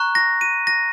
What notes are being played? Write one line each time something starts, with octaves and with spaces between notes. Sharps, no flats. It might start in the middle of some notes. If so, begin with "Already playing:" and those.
Already playing: A#5 C#6 F#6
A#6
D#7
A#6